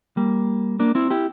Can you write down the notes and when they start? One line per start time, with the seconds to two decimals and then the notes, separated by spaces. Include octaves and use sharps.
0.17 G3 A#3
0.80 A#3 D4
0.95 C4 E4
1.10 E4 G4